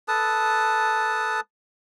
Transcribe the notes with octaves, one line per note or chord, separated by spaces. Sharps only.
A4 B4 A5 D#6